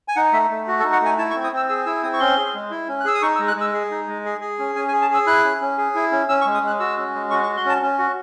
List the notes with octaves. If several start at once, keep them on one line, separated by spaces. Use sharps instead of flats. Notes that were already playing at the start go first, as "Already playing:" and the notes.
G#5
D#4 F#5
A3 E5
A3
F#4
A4
D#4
F#5
A3 G#5
E4 A5
C#6
C4
D#6
C4 E6
G#4 E6
E4 E6
C4 D#6
C#6
C#4 C6
G#4
G#3
E4
C#4
F#6
G#4 E6
D#6
D#4 C#6
E6
G#3
F#6
G#3
E6
G#4
D#4
G#3
G#4
G#4
C#4
C#4 G#5
G#5
G#4
A5
G#4 E6
E4 F#6
C#4
C#4
G#4
E4
C#4
C#4 E6
C#6
G#3
D#6
G#3 F#6
F#4 E6
C#4
G#3
F#4 C#6
C#6
F#4
C6
C#4 A5
C#4
F#4